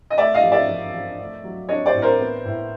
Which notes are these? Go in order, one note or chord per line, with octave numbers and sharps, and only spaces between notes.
D#5
A3 D5 E5
D#5 F5
F3
D5 E5
F3
F3
A3
F#3
D4 C#5 D#5
C5 D5
A2
A#4 C5
B3
A2